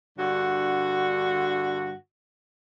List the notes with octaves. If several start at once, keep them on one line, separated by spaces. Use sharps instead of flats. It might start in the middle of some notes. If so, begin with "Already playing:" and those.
G2 D3 F#4